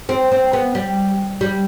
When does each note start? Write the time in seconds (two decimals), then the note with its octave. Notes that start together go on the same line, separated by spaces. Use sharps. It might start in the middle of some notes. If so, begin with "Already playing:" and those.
0.09 C4
0.32 C4
0.53 B3
0.75 G3
1.41 G3